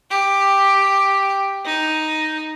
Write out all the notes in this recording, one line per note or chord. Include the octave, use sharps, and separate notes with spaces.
G4
D#4